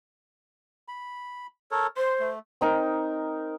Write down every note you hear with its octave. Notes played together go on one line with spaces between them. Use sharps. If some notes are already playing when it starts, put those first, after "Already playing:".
B5
A4 A#4 C#5
C5 C6
A3
C4 D#4 A#4